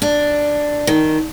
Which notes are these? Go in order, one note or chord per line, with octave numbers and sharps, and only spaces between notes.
D4
D#3